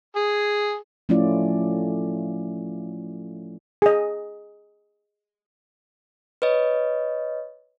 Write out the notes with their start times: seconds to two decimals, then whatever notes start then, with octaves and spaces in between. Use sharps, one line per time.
0.16 G#4
1.09 F3 A3 C#4 E4 F4 D5
3.82 G#4 D#5
6.42 B4 C#5 D#5